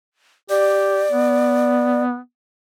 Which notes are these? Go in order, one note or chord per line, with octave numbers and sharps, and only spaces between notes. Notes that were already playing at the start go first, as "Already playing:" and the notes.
G4 D5
B3